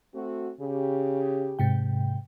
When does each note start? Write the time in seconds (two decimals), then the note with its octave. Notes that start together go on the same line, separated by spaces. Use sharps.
0.14 A3 C4 F#4
0.60 C#3 G4
1.59 G#2 C3 G5